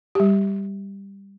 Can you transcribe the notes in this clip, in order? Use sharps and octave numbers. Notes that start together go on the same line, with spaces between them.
G3 G4